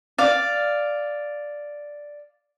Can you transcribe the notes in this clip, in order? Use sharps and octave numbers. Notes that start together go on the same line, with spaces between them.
D5 F5